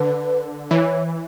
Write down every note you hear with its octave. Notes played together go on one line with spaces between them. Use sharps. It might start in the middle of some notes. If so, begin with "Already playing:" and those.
Already playing: D3 B4
E3 C#5